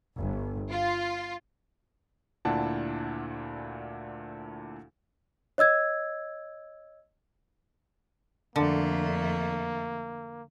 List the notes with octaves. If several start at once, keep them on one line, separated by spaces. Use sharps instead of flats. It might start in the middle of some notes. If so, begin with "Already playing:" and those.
G1
F4
D2 A#2 D4 E4 F#5 A5
C#5 D#5 E6 G#6
F2 D3 A3 A#3